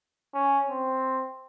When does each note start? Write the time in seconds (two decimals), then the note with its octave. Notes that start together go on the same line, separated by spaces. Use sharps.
0.34 C#4
0.69 C4